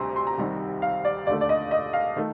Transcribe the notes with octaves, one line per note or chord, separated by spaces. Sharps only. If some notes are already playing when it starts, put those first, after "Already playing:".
Already playing: D2 C3 G3 A#5 C6
C6
A#5
C2 C3 D#3 G3
F5
D5
D#2 D3 A3 D5
D5
D#5
D#5
F5
D#3 A3